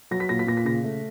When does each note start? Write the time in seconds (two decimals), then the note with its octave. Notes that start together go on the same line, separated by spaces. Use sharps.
0.11 F#3 A#6
0.20 B6
0.29 A#2 A#6
0.39 B6
0.47 A#2 A#6
0.57 B6
0.65 C#3 A#6
0.84 A3